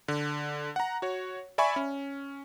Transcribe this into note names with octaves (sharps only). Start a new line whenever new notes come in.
D3
F#5 A#5
F#4 C#5
D5 E5 G#5 B5 C#6
C#4